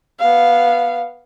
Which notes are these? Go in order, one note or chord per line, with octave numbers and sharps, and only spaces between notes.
B3 F5